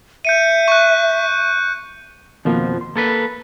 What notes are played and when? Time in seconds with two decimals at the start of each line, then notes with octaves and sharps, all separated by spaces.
0.25 E5 G6 C#7 D#7
0.68 C#6 F#6
2.45 F2 B2 D#3 F3 A#3 F4
2.81 C6
2.96 A#3 A4 B4
3.09 B5